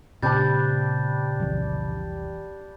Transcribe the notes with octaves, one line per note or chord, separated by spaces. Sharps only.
A#2 C#3 G3 C4 D4 G6 A6
F1 C2 E3